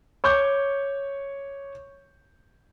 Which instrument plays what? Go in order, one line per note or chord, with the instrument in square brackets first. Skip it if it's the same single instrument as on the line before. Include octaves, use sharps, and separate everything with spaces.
[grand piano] C#5 C#6 D6 G6